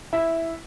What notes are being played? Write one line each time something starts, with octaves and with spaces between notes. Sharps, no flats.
E4